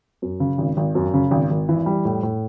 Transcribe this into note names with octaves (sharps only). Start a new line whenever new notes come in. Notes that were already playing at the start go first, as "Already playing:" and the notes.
F#2
C#3
G#1
G#1
F#2
C#3
G#1
G#1
E3
G3
A2
A2